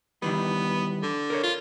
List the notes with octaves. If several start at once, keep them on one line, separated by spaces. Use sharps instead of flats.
D#3 E3 G3 B3
D3
A#4 C#5
F4